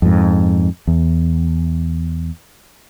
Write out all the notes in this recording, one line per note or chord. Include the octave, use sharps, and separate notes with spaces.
F2 G#2
E2